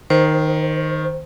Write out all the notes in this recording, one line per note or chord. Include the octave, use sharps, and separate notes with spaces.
D#3 C5